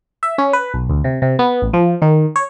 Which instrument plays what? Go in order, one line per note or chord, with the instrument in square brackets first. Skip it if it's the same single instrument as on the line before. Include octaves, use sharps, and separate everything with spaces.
[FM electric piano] E5
C#4
B4
B1
D2
C3
C3
B3
A1
F3
D#3
C#5